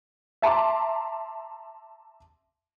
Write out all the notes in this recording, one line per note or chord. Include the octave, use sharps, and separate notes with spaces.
E5 A5 A#5 C6 D6